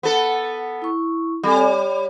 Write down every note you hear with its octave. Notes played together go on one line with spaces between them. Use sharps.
B3 A4
E4 C#6
G3 C4 A4 G#5
C#5